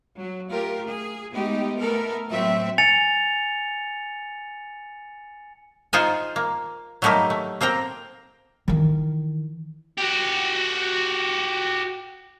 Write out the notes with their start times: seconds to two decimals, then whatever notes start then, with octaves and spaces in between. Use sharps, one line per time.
0.17 F#3
0.50 A3 F4 G4 A#4
0.85 G#4
1.34 G#3 A3 B3 D#4 G4
1.79 A3 B3 A4 A#4
2.29 A2 F#3 A3 C4 E5
2.78 G#5 A6 C#7 F7
5.93 D#4 F4 G#4 C5 F#5 G#5
6.36 A#3
7.02 F#3 G3 A3 A#3 D#4 G4
7.30 A3
7.61 A#3 C4 G5 A#5
8.68 D#3 E3
9.98 F#4 G4